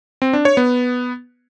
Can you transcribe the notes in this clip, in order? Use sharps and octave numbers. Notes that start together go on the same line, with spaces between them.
C4
D4
C#5
B3